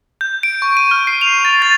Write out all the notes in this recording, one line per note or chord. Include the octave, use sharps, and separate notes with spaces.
G6
D7
C#6
D#7
F6
C7
F7
A6
A6